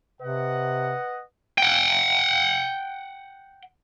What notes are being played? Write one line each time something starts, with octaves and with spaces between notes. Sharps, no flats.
C3 B4 D#5 F#5
F#5 G5